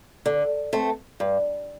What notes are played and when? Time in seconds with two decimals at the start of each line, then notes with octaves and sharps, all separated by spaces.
0.26 D3
0.73 A3 C4
1.20 G2